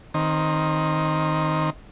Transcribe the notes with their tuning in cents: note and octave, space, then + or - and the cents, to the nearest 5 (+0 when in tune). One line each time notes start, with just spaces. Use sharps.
D#3 +0 C4 +10